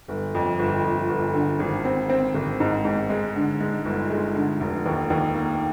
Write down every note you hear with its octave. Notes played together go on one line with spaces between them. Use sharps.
G1
F2
G1
F2
G1
D3
G#1
C4
C4
G#1
G#2
G#2
G#3
D3
G#3
G1
G#3
D3
F1
D#2
D#2
A#3